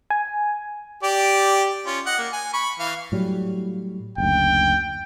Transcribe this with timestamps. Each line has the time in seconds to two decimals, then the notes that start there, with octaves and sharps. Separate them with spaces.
0.10 G#5
1.03 G4 D5
1.86 C#4 F4
2.06 D#5 F#5
2.18 A#3
2.33 G#5
2.53 B5 C#6
2.79 E3 F5
3.12 A2 F#3 G3
4.18 F#1 D2 G5